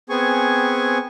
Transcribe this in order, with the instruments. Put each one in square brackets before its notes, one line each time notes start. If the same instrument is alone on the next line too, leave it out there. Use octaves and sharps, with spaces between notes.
[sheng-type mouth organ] B3 C4 G#4 G#5 C#6